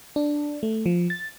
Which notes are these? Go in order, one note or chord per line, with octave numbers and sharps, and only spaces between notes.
D4
A3
F3
A6